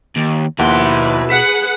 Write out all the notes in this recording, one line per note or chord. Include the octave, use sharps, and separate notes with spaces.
D#2
D#2 B2 F3 E4 B4 F#5 C6
G#4 B4 F#5 B6 E7